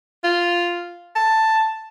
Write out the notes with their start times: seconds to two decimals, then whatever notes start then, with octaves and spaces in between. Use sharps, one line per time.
0.24 F4
1.16 A5